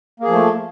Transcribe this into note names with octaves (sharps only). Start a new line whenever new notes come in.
F3 A3 A#3 G#4